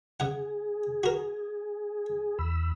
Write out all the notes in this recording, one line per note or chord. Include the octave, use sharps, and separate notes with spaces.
C#3 G#4 F#5
F#4 A#4
E2 B5 E6